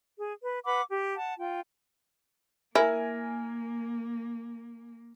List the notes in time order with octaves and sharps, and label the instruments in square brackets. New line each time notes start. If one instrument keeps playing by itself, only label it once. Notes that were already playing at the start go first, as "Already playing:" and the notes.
[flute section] G#4
B4
B4 F#5 B5 D6
G4
F#5 A5
F4 G5
[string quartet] A#3 [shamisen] E4 [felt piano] A#4 G#5